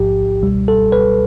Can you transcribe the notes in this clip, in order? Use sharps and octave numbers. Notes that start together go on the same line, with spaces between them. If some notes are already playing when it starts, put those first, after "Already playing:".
Already playing: A1 G#2 F3 G4
C#2 B2 G3
A4
B4